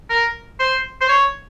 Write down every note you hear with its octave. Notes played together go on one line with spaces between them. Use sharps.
A#4
C5
C5
C#5